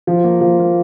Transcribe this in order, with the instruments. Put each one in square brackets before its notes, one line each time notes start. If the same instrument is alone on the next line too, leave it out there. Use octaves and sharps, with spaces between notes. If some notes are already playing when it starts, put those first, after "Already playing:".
[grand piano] F3
A#3
F3
A#3